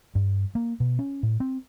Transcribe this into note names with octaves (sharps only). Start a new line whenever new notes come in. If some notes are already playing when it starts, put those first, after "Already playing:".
G2
A#3
B2
C#4
A2
C4